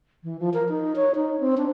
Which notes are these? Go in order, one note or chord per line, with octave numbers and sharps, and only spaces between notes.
E3
F3
A#4
D#4
C#5
D#4
C4
D4